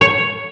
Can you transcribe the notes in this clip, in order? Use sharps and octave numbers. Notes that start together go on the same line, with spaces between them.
C#5